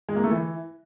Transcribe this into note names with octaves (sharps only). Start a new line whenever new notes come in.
G#3
A#3
A3
E3